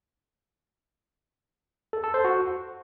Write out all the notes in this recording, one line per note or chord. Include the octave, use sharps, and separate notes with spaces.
A4
A4
C5
F#4